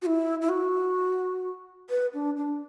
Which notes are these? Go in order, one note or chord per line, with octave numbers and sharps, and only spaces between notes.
F#4
E4
E4
F#4
B4
D4
D4